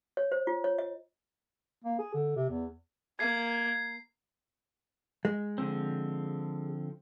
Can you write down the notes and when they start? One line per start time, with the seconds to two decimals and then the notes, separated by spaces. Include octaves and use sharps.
0.17 C#5
0.32 C5
0.47 F4
0.64 C#5
0.78 D#5
1.85 A#3
1.99 G#4
2.14 D3
2.36 C3
2.50 E2
3.19 A#3 G#6 C7
5.25 G#3
5.58 D3 F3 C4